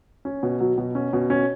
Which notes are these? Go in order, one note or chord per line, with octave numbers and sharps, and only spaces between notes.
C#4
B2
F#3
B2
C#4
B2
C#4